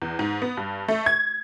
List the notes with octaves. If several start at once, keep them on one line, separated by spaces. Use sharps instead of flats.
E2
G#2
B3
G2
A3
G#6